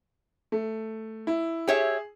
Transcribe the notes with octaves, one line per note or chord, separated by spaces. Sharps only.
A3
E4
G4 G#4 C#5 E5